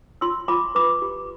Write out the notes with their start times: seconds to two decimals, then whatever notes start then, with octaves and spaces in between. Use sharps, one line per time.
0.21 F4 C6 E6
0.48 F4 B5 D6
0.75 B4 B5 D6
1.02 G4